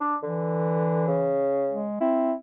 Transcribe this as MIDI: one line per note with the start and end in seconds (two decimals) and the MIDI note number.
0.01 0.16 62
0.23 1.07 50
0.23 1.47 52
1.08 1.85 49
1.71 1.97 56
2.01 2.35 60
2.01 2.33 64